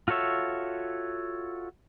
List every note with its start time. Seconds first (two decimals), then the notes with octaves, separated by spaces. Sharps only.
0.08 F4 F#4 A4 C#5 E5